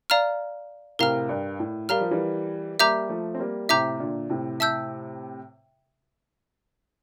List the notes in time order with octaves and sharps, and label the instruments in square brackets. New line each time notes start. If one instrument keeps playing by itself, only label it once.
[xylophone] D5 F5 A#5 F6
[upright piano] A2 C3 [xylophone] A#4 F5 A#5 F6
[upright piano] G2
A2
[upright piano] G3 [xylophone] A#4 F5 A#5 F6
[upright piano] F3
E3 G3
[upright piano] G3 A#3 [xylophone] E5 A#5 D6 G6
[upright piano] F3 A3
C4
G3 A#3
[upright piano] A2 C3 [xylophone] E5 A#5 D6 G6
[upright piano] A#2 D3
A2 C3
[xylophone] E5 A5 E6 G6